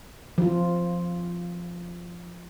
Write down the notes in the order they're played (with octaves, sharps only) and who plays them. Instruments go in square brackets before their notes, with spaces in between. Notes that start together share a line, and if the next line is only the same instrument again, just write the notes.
[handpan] F3 F4